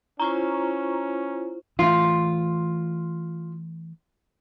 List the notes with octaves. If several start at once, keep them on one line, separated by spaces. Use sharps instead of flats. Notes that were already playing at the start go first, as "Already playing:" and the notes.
C#4 E4 F4 C5 A#5 C#6
E3 A3 F4